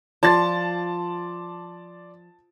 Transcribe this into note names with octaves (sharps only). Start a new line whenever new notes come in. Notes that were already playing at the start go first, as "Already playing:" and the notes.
F3 D5 A5 C6 A6